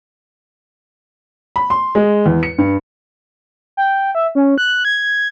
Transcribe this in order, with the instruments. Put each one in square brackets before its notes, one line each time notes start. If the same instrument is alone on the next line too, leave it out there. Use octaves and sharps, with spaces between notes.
[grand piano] B5
C6
G#3
E2
C#7
G2
[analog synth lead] G5
E5
C#4
F#6
G#6